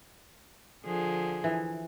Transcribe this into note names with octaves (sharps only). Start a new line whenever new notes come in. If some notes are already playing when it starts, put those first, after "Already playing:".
D3 F3 G#4
E3